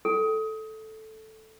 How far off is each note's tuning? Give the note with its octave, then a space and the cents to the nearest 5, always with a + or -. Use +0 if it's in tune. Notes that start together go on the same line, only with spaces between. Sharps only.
A4 -5